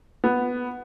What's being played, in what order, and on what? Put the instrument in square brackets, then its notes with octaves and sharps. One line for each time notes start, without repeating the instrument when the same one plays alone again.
[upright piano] B3